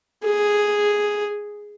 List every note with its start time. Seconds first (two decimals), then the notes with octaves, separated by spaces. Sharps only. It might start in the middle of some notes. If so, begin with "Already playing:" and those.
0.24 G#4